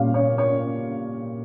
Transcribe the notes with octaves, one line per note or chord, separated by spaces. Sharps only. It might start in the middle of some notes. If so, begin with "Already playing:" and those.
Already playing: A#2 G3 C#4 F5
C#5
C#5